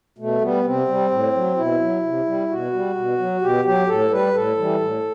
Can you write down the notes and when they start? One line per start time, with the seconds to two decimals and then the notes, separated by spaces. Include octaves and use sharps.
0.18 B2 A3
0.41 G3 B3
0.64 C3 C4
0.88 G3
1.11 A2
1.34 F#3
1.57 B2 E4
1.80 F#3
2.03 C3
2.26 G3
2.49 B2 F#4
2.73 G3
2.96 B2
3.18 F#3
3.42 B2 G4
3.65 F#3 G4
3.88 A2 A4
4.11 G3 B4
4.34 A2 A4
4.57 E3 G3
4.81 A2